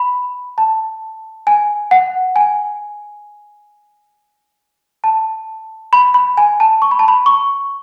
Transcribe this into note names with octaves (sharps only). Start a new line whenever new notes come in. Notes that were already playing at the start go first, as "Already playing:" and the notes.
Already playing: B5
A5
G#5
F#5
G#5
A5
B5
B5
G#5
A5
C#6
B5
A5
B5
C#6